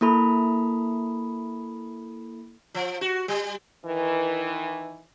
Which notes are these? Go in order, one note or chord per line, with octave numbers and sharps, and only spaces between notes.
A#3 E4 A4 B5
F3
F#4
G3
D#3 E3